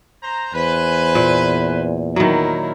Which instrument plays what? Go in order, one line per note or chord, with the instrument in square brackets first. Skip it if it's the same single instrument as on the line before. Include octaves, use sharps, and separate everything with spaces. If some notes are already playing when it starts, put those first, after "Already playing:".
[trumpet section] C5 A#5
[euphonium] E2 [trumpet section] B4 [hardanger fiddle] C5 G#5
[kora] A#2
[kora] D#3 F#3 [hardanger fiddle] E4 A#4